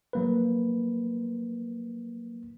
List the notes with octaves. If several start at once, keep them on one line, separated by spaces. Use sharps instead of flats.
F#3 A#3 B4